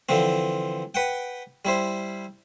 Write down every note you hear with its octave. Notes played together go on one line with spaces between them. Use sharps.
D3 E3 F3 C4
B4 F#5 G5
G3 E4 C5